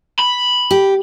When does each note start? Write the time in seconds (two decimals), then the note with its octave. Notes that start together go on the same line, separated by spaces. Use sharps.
0.19 B5
0.71 G4